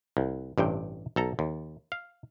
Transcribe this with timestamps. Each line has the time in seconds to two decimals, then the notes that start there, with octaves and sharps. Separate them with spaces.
0.17 C2
0.58 A1 G2 C3 G5
1.16 B1 A4 A#5
1.39 D#2
1.92 F5